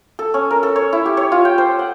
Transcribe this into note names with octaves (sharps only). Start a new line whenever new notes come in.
A4
C#4
A#4
A4
C#5
E4
G4
C#5
F4
G5
C5
F#5